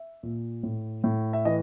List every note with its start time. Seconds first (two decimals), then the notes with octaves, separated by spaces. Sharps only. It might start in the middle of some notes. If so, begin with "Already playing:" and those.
Already playing: E5
0.23 A#2
0.63 A2
1.04 A2
1.33 E5
1.45 E3 D#5